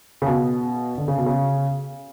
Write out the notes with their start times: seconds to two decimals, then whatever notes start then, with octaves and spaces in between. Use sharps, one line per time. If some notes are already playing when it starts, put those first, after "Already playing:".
0.22 C#3
0.26 B2
0.98 D3
1.08 C#3
1.17 B2
1.26 C#3